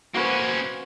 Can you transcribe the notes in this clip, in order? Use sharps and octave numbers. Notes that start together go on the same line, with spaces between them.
A#3 C#4 F#4 B4 C5
B4